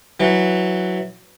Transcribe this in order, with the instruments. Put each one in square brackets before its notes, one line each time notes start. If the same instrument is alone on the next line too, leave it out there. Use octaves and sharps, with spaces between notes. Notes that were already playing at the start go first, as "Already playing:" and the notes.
[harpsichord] E3 F#3